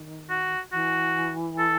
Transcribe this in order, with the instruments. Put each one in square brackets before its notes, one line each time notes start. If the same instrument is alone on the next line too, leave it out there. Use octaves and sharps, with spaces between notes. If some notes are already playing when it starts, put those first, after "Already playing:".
Already playing: [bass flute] D#3
[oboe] F#4
[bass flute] E3 [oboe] F#4
[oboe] A4